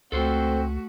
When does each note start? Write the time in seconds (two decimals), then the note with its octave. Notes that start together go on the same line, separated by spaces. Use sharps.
0.12 C#2 A3 C4 F#4 A4 C5